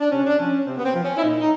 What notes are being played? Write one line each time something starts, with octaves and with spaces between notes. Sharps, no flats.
D4
C3 C#4
D4
F3 C#4
C3 C4
B3
C4
F3
C#4
E4
A#2 D#4
D#4